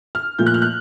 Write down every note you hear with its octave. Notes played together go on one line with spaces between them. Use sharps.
F6
A#2 F3 A3 G6
F#6
F6
F#6